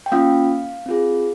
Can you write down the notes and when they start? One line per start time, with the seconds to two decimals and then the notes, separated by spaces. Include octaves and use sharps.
0.06 G5
0.12 A#3 C#4 F4 F5
0.86 C4 F4 G#4